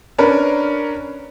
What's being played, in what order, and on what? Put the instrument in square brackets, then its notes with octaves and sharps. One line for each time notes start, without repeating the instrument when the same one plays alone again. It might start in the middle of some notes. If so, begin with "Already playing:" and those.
[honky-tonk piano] C#4 D4 A#4 B4